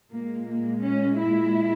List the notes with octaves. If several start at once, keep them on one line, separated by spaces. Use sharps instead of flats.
A#2 G#3 A#3
A#3
C#4
E4